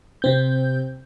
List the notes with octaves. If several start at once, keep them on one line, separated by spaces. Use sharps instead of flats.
C3 C4 G6